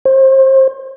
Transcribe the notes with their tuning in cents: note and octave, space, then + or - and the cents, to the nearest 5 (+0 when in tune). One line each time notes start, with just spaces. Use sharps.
C5 +30